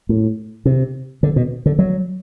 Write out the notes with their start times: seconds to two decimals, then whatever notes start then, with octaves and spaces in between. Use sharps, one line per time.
0.09 A2
0.65 C3
1.23 D3
1.36 B2
1.66 D3
1.79 F#3